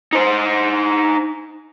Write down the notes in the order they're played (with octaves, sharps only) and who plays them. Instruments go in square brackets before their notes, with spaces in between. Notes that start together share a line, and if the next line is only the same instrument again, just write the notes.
[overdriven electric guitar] D#4 C5